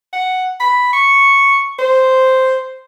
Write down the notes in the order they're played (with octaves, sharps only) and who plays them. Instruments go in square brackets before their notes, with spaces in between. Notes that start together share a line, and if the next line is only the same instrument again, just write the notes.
[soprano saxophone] F#5
B5
C#6
C5